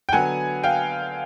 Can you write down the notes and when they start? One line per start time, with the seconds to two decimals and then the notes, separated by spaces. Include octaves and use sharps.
0.09 G5
0.12 D3 F#3 B3 F#5 G#5
0.63 F5 G5